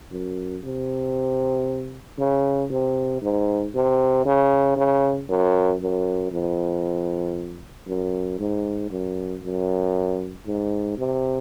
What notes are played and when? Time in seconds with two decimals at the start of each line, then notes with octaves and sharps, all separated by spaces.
0.11 F#2
0.64 C3
2.18 C#3
2.70 C3
3.22 G#2
3.74 C3
4.25 C#3
4.76 C#3
5.29 F#2
5.81 F#2
6.32 F2
7.87 F#2
8.39 G#2
8.90 F#2
9.43 F#2
10.46 G#2
10.98 C3